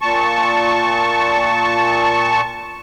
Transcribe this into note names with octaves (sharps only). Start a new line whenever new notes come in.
A#2 A5 C#6